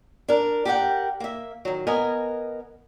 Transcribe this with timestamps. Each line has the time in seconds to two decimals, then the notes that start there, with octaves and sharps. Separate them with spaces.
0.28 D4 A#4
0.65 G4 G#4 A#4 D5 F#5 G5
1.20 A#3 E5
1.65 D#3 F#3
1.87 B3 A#4 D#5 G#5